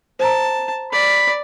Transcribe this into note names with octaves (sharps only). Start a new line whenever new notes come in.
C5 A5 A#5
D5 B5